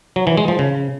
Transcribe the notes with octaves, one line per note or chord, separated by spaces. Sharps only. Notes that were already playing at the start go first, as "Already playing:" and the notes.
F#3
E3
G#3
F3
C#3